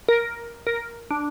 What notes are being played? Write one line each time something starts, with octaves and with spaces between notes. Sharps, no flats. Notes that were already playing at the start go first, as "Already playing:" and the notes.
A#4
A#4
D4